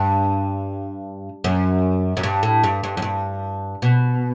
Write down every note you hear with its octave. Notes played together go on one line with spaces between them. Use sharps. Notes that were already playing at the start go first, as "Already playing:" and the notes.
Already playing: G2
F#2
F#2
G2
A2
G2
G2
F#2
G2
B2